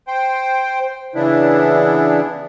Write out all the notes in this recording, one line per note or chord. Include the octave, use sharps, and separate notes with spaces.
C5 G5
C#3 E3 B3 D4 E4